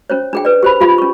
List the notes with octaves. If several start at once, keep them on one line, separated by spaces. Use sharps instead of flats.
C#4 C5 C#5
D4 G#4 G5
B4 D5
G4 C5 B5
F4 G4 F5 B5
C#4 C#6